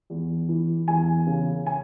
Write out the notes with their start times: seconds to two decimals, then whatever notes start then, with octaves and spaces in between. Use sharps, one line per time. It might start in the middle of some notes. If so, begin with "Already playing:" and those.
0.10 E2
0.48 E3
0.88 E2 G#5
1.27 C#3
1.66 G#5